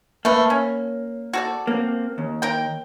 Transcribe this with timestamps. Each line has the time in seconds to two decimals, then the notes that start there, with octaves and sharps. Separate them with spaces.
0.25 A3 A#3 B4
0.50 C#4
1.33 F#4 A4 D5
1.67 A#3 C4
2.18 D#2
2.42 A#4 G5